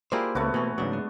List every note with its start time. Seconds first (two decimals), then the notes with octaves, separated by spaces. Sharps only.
0.12 A#3 E4 F4 G4 G#4 A#4 C5 D5
0.35 C#2 A3 B3 F#4
0.54 B2 E3 C#4
0.78 G#2 C#3 F#3 D4
0.93 G#3